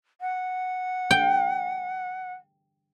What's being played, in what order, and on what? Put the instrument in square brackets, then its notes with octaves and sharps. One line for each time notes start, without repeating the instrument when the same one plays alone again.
[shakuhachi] F#5
[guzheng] G5